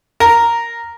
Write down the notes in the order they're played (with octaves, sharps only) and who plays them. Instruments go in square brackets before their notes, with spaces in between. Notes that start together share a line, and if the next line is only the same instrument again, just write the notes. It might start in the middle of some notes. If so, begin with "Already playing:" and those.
[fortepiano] A#4